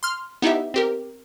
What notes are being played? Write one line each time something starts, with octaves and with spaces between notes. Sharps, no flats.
C6 F6
B3 D#4 E4 G4 E5
C4 G4 A#4